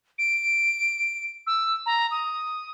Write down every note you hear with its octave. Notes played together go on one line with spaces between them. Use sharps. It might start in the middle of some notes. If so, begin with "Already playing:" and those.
D7
E6
A#5
D#6